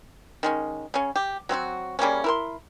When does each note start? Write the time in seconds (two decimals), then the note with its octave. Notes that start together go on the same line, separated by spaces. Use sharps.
0.43 D#3 G#3 C#4
0.94 C#3 C#4
1.16 G4
1.49 F#3 C4 F4 F#4
1.99 C#3 G3 A#3 C#4
2.24 E4 A#4 C6